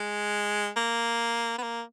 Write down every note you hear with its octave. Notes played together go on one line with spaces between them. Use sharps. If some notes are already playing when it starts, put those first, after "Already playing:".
Already playing: G#3
A#3
B3
A#3